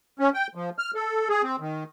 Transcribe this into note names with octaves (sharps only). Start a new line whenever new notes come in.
C#4
G5
F3
F6
A4
G#4
C4
D#3